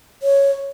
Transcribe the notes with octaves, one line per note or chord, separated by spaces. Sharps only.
C#5